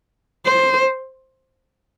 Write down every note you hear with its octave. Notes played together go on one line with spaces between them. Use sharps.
C5